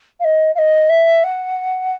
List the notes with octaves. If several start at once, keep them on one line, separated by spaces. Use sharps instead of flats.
F5
D#5
F5
D#5
E5
F#5